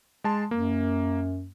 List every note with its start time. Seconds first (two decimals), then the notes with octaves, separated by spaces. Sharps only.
0.24 G#3 A5 C6
0.51 F#2 A#3